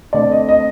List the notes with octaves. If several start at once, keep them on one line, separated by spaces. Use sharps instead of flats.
D3 A3 C4 D5
D#5
D#5